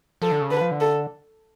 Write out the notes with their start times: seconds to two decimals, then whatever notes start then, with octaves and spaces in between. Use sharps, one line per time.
0.22 F3 A4
0.32 D3
0.41 C#3
0.51 D3 B4
0.61 F3
0.71 D3
0.81 A4